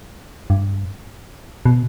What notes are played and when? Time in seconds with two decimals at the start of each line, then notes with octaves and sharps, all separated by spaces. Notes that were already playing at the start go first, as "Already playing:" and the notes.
0.50 G2
1.66 B2